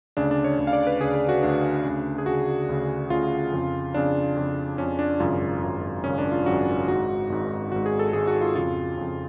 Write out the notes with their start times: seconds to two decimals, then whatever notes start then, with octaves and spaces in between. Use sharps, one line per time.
0.17 D2 C#3 D4
0.31 D4
0.44 C#5
0.58 D2 C#3
0.67 F5
0.73 D5
0.87 B4
1.00 D2 C#3 G#4
1.15 G#4
1.29 F#4
1.43 D2 C#3 D4
1.85 D2 C#3
2.18 G#4
2.26 D2 C#3 F#4
2.69 D2 C#3
3.10 D2 C#3 F4
3.52 F2 C#3
3.94 F2 C#3 D4
4.36 F2 C#3
4.78 F2 C#3 C#4
4.99 D4
5.20 G#1 F#2 C#3 F4
5.62 G#1 F#2 C#3
6.04 G#1 F#2 C#3 C#4
6.18 D4
6.32 F4
6.46 G#1 F#2 C#3 F#4
6.88 G#1 G#2 F#4
7.30 G#1 G#2
7.72 G#1 G#2 F#4
7.86 G#4
7.99 A4
8.13 G#1 G#2 G#4
8.27 F#4
8.41 F4
8.56 F2 C#3 F4
8.97 F2 C#3